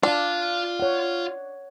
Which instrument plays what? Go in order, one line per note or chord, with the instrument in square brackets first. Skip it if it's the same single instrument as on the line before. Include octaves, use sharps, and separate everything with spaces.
[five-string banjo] D4 [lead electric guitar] F4 F5
[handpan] C#5 F#5